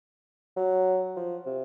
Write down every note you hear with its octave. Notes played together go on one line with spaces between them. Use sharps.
F#3
F3
C3